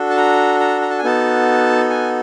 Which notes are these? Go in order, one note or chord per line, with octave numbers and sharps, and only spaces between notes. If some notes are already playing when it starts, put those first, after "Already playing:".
Already playing: D4 F#4 A4
A5
A#5
A#5
A#5
A5
G#5
B3 D#4 F#4 A4 A5
G#5